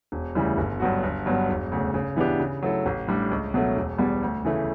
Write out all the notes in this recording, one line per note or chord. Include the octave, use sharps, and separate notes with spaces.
E1
D2 C#3 E3 G3
G1
G2 F#3 B3 F#4
G1
G2 F#3 B3
E1
D2 C#3
C#3
E3 B3 D4 G4
C#3
F#3 A3 E4 A4
A1
A2 G3 D4
C#2
B2 F#3 A3
E1
E2 B2 G3
D2
C#3 E3 A3